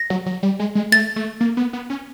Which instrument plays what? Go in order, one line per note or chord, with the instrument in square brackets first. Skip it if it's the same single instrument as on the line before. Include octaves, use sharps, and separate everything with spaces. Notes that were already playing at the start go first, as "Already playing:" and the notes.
Already playing: [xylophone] A#6
[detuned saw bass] F#3
F#3
G3
G#3
G#3
[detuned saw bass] A3 [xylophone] A6
[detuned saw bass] A3
A#3
B3
B3
C#4